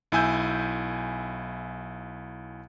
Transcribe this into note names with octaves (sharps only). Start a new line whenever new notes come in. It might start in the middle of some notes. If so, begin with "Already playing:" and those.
B1 E4 G#5 E6 G6